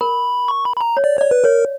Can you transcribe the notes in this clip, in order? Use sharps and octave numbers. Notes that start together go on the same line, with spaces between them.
A#4 B5
C#6
B5
B5
A#5
C#5
D5
C#5 D5
B4
A#4 C#5